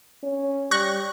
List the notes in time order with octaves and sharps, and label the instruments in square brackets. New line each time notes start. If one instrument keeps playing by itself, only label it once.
[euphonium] C#4
[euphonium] G3 [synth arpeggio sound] C#6 F#6 A#6